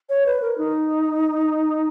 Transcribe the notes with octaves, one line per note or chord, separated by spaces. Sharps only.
C#5
B4
A#4
D#4